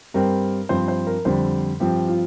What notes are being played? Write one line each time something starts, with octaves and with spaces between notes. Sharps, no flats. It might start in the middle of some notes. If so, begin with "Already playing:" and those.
G2 G3 C4 A#4
G2 F3 C4 C5
C5
A#4
F2 D3 G3 C5
G2 F3 C4 G4
F4